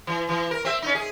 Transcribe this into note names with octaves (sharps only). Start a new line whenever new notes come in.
E3
E3
A#4
C4 E5
C#4 D#4
G#4